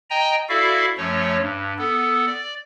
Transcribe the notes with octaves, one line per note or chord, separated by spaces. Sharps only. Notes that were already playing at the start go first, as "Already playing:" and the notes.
D#5 G5 G#5 A#5
E4 F#4 A4 D5 E5 F5
F#2 F3 A3 C#5
G2
B3 A4
D5